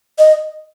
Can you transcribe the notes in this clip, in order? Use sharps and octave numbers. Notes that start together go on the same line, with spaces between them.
D#5